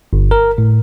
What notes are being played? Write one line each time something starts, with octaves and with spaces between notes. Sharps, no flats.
G1
A#4
A2